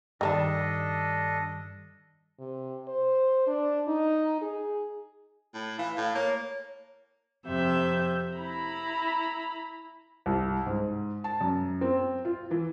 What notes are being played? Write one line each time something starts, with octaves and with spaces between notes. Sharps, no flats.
G2 D#3 G3 D4 A4 A#4 D#5 A5
C3
C5
D4
D#4
G#4
A2
E3 F5
A2
A#3 C#5
F2 C3 E5 G6
E4 A#5 B5
C2
G#2
A5
F#2
C4
F4
E3